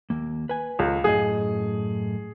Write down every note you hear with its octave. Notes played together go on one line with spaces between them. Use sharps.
D#2 A#3
B4 G#5
C#2 C#3 G#3 A4
F#2 A2 G#4 D#5